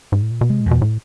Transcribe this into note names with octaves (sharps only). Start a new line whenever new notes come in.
G#2
A2
A#2
B2
C3 G#3
A#2
E2
B2
A2